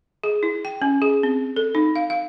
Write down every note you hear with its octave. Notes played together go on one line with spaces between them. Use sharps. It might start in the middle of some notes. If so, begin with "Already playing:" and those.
G#4
E4
G5
C#4
G#4
C4
A4
D#4
F5
F5